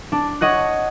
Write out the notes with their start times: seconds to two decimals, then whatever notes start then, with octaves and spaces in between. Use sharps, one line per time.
0.12 D4
0.41 C#5 D#5 F#5 F#6